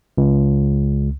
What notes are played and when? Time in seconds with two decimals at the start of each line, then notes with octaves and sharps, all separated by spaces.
0.17 C#2